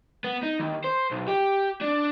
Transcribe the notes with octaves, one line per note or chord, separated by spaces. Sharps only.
B3
D#4
D#2
C5
B1
G4
D4